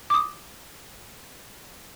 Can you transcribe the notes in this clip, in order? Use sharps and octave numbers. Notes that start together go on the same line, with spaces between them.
D6 D#6